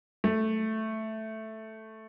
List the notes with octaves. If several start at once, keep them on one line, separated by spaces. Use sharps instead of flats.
A3